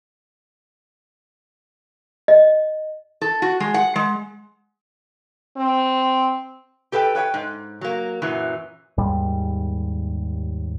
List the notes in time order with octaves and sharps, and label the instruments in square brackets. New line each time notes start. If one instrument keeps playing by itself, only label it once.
[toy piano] D#5
[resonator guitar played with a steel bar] A4
F#4
G#3
F#5
G#3
[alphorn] C4
[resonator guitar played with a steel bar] G4 A4 B4 E5 G5
B4 C#5 E5 G5
G#2
F#3 A#3
F#2 A#2 E3 F#3
[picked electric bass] D#2 G#2 G3